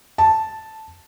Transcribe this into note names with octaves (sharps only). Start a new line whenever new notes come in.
A5